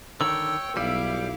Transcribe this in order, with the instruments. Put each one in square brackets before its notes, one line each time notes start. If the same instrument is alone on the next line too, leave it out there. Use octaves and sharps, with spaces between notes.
[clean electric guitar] D3 D#3 [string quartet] C#5 G5 [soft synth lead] E6
[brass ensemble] B1 [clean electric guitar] G3 [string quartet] E4 F5 D6